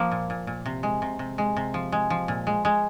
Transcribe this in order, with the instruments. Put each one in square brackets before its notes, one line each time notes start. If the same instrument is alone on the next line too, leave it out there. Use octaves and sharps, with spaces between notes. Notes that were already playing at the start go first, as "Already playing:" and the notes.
Already playing: [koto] F3 A#3
A#2
A#2
A#2
C3
G#3
C3
C3
G#3
C3
F3
G#3
F3
A#2
G#3
G#3